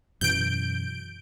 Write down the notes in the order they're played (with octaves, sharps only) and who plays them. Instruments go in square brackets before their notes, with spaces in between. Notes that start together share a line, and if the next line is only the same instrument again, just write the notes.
[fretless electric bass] F#2 B2 E3 [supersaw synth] G6 D7